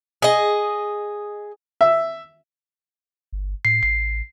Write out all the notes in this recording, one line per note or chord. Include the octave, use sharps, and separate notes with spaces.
G#4 D#5
E5
G1
A2 C7
A1 C7